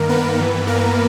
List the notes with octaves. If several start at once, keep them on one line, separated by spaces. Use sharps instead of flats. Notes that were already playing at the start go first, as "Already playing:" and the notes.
Already playing: G2 D#3 A#3 A#4
B3 B4
G2 E3
A#3 A#4